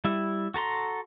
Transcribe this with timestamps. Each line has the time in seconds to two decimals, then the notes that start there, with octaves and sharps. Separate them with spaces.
0.05 G3 E4
0.54 F#4 A4 A#5 C6